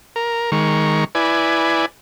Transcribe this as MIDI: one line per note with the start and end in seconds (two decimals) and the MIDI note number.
0.16 0.51 70
0.52 1.04 51
0.52 1.04 56
0.52 1.04 70
0.52 1.04 85
1.15 1.86 64
1.15 1.86 71
1.15 1.86 74
1.15 1.86 80